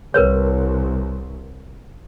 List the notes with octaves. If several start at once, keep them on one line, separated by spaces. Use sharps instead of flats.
C2 A#4 B4 C#5